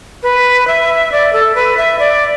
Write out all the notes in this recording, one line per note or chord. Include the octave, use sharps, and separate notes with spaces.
B4
E5
D5
A4
B4
E5
D5